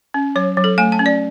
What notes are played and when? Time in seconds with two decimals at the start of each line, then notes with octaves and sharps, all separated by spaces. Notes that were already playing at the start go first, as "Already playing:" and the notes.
0.14 C#4
0.36 F#3 C#5
0.57 F#3
0.64 A4
0.78 A3 G#5
0.92 A5
0.99 C#4
1.06 D5